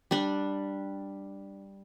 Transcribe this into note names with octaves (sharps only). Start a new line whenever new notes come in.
G3 D4